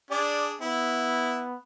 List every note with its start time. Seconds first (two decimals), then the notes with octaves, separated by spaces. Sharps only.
0.11 D4 G#4 D5
0.61 B3 E4